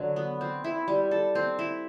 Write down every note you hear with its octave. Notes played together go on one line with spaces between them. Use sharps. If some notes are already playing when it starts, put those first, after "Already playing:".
Already playing: D3 F#3
B3
C4
E4
G3
A4
C4
E4